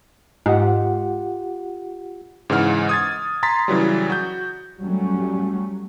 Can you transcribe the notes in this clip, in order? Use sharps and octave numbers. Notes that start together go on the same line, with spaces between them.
G#2 F4 G4 F#5
G#2 C#3 E3 F#5 F6
D#6 G#6 A6
A#5 C6 A6 B6
C#3 E3 F#3 G3
F#4 G6
F#3 G3 A3 C#4